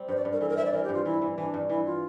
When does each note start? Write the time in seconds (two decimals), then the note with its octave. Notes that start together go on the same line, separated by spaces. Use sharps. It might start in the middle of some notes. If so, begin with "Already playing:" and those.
Already playing: G3 C4
0.09 G2 C5
0.16 D5
0.25 G2
0.33 A#4
0.41 E3 A4
0.49 A#4
0.57 C4 E5
0.65 D5
0.73 E3 A#4
0.84 G4
0.89 G2
0.94 F4
1.05 E3 E4
1.21 E3
1.37 E3 D4
1.54 G2
1.70 E3 E4
1.85 F4